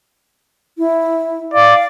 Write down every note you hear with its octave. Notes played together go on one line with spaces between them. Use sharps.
E4
D5 F5